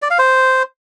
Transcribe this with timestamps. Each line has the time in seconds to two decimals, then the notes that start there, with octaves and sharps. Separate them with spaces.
0.02 D5
0.10 F5
0.19 C5